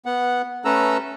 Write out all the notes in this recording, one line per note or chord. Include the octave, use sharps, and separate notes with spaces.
B3 F#5
A3 C#4 A4 B4 A#5 E6